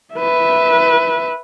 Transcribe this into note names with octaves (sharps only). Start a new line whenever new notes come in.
B4 E5